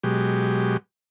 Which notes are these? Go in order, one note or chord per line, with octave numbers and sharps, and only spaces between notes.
B2 F#3 G#3 G4